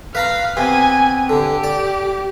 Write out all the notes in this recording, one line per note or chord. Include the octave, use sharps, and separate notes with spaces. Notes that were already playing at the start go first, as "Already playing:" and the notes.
B4 F5 A#5 B5
C3 B3 G#5
D3 G4
D5